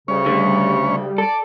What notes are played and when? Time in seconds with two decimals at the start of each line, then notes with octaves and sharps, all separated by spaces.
0.08 D2 C#3 G3 C#4 C#5
0.26 D3 A3
1.18 A4 D5